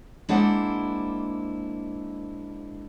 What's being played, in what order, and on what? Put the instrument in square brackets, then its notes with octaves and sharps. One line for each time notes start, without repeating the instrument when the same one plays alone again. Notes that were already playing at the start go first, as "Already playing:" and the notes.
[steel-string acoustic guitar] G#3 A#3 D4 E4 C5 F#5